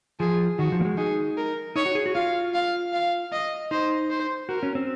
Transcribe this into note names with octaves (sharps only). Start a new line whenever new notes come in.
F3 G#4
D#3 F#4
F3
A#3
G#3
D#4 G#4
A#4
D#4 C#5
F#4
G#4
F#4
F4 F5
F5
F5
D#5
D#4 C5
C5
F#4 A#4
C#4
C4